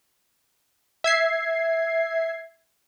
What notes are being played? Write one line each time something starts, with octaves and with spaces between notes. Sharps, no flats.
E5 G#6 C7